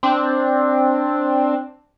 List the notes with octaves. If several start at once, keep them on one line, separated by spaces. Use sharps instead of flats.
C4 D4